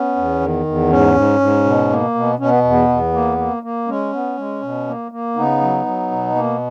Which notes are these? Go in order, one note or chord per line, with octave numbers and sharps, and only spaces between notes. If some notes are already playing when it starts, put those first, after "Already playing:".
Already playing: B3 C#4
E2
D#3
E2
G#2 C#4
G#2
G#2
B2
A#3
B2
B2 C#4
B3
E2
B3
E2
A#3
A#3
A#3
G#3 C#4
B3
G#3
B2
A#3
A#3
C#3 B3 D#4
F#3
F#3
B2
A#3